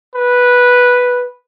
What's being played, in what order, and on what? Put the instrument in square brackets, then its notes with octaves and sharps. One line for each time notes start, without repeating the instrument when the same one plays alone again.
[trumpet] B4